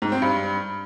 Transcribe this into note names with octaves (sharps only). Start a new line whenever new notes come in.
G#2
C4
G2